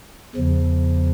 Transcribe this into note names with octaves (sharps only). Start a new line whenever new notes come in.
E2 C#3 F3